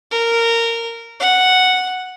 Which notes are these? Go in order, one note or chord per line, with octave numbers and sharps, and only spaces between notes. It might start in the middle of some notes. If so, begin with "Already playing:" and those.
A#4
F#5